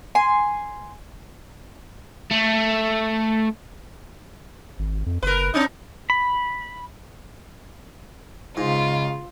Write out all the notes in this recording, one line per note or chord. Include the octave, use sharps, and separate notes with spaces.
G#5 C6
A3
G#1
F2
F#1 A#4 B4
C4 D4 D#4
B5
G#2 C#3 F4